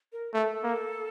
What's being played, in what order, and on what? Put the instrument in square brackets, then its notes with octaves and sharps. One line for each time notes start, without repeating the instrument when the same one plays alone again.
[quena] A#4
[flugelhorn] A3 [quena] A4
[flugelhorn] A#3